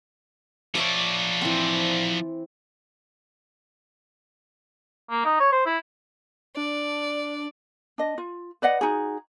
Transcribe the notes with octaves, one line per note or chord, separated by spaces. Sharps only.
F3 C#5 D5 E5 D6
E3 C4
A#3
D#4
C#5
C5
E4
D4 D5
D4 D#5
F4
B4 D5 D#5 F#5
D#4 F#4 G#4